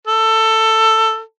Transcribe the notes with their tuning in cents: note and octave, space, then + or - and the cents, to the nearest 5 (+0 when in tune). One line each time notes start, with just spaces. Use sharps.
A4 +15